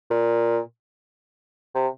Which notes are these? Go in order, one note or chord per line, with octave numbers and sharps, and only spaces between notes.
A#2
C3